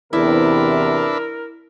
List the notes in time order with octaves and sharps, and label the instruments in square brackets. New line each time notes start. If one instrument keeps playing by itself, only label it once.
[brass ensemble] E2 C3 [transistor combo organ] D4 B4 E5 [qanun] E4 [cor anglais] A#4